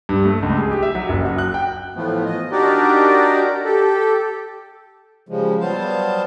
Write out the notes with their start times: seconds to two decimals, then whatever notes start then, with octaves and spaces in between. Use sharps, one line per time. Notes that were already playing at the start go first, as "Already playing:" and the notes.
0.09 G2
0.25 A3
0.43 C#2
0.58 G#4
0.71 G4
0.83 E5
0.95 F#3
1.09 F#1
1.25 F#4
1.38 F#6
1.54 G5
1.96 A2 E3 F3 A3 B3
2.25 D#5
2.52 D4 D#4 F#4 G4 A#4 D5
3.65 G4 A4
5.29 C#3 F3 G3 G#3
5.61 F#3 G3 B3 C5 F5 A5